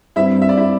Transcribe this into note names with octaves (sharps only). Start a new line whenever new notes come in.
G2 G3 C4 E4 E5
E5
D5
E4 E5